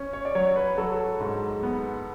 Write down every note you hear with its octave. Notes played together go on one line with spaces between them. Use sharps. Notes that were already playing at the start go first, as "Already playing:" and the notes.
Already playing: C#4
C#5
D5
F#3 C#5
B4
F#3 A4
G#2
B3